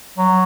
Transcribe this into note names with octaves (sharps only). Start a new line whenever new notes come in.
F#3